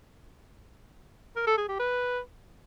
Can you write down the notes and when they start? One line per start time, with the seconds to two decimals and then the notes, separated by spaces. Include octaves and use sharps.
1.36 A#4
1.47 A4
1.58 G#4
1.69 G4
1.79 B4